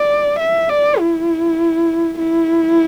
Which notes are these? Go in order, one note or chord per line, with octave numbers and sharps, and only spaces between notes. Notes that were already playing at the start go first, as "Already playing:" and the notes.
Already playing: D5
E5
D5
E4
E4